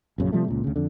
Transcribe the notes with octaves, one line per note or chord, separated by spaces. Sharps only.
A#1 F#2 C#3
C3 F3 G3 A3
C#2 A#2
D2 C#3
F2 D3